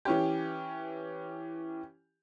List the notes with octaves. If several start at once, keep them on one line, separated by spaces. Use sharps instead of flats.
E3 C#4 G4